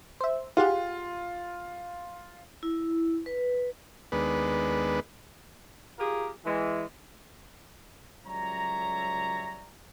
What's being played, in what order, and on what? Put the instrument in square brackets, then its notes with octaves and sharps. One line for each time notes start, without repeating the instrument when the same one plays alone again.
[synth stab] C5 E5
[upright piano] F4 [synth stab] G4 G#4 F#5
[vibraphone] E4
B4
[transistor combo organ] D#2 G#3 B3 D4 B4
[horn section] F4 G4 G#4 A#4
E3 G#3
[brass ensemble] C#2 F#3 G3 C#5 E5 A#5